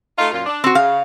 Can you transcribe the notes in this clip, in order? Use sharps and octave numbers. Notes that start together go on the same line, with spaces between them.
A3 D#4 F4
F#2 A#2 F4
D4
C4 F#4
C#3 F5